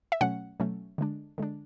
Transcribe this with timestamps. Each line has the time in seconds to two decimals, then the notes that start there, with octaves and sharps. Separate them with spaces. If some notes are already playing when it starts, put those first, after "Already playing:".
0.12 E5
0.21 B2 F#3 A3 C#4 F#5
0.60 B2 F#3 A3 C#4
0.98 D3 G#3 D4
1.38 D3 G#3 D4